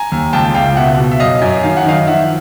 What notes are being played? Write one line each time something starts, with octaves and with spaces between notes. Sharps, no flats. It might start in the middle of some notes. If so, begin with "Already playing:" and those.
Already playing: G#5 A#5
D#2
C#2 G5 A5
C#2 F5 G5
B2 E5 F#5
B2
E5
F#2 D#5 F5
F#2
D#3 F5
F#5
D#3 D#5 F5
F3 E5 F#5